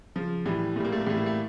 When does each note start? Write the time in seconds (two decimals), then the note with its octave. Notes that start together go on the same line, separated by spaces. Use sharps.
0.16 C#3 F3
0.45 A2 E3 G3
0.76 A#2 A3
0.80 G3 A#3
0.92 A3
1.01 A#3
1.06 A2 E3 G3 A3
1.17 A#3
1.26 A3